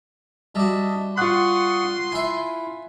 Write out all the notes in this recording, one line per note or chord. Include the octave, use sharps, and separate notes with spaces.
G3 F#4 D#5 E5 A5
F4 F#5 C6 C#6 D#6 F#6
E4 E5 G#5